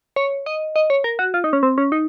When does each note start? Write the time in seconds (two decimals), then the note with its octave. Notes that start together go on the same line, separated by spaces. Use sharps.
0.16 C#5
0.46 D#5
0.76 D#5
0.90 C#5
1.04 A#4
1.19 F#4
1.34 F4
1.44 D#4
1.53 C#4
1.63 C4
1.78 C#4
1.92 D#4